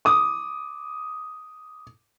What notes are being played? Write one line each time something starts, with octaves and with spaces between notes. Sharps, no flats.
D6 D#6